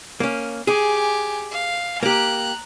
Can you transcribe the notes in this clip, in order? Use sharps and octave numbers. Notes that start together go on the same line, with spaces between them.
A#3 C#4
G4 G#4 G#5
F5
A#3 G4 A#5 F#6